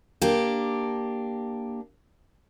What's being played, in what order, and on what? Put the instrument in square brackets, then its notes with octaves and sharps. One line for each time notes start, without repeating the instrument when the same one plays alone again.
[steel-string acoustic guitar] A#3 D4 G4